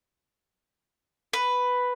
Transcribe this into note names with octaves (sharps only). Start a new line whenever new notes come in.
B4